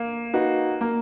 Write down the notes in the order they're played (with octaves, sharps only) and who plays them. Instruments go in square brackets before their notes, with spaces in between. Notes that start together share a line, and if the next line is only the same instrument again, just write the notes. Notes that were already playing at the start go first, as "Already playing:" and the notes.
Already playing: [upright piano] A#3
[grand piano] D#4 F#4 B4
A#3